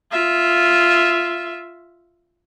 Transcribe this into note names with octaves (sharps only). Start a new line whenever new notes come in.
F4 E5